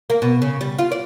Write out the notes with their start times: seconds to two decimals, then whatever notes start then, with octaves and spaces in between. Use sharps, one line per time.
0.10 A#3
0.22 B2
0.42 C#3
0.61 G3
0.78 F4
0.92 D5